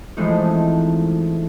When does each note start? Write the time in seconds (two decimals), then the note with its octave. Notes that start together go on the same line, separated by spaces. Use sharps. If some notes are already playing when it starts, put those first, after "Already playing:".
0.17 E3 F3 G#3 A3 C4 D#4